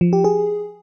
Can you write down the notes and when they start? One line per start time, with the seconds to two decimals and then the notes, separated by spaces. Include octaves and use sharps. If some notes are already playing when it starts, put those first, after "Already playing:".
0.01 F3
0.13 G4
0.24 G#4